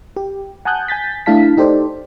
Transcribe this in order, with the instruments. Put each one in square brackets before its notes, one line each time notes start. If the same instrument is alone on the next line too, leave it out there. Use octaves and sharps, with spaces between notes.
[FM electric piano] G4
F#5 G#5 A5 D#6 F#6 G6
G#5 G6 A6 B6
A3 D4 E4 F5 A5 B6
D#4 G4 A4 C5 D5